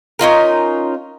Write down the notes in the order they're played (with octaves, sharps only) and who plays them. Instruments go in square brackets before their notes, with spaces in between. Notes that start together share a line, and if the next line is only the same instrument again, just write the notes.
[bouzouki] C#4 D#4 F4 A#4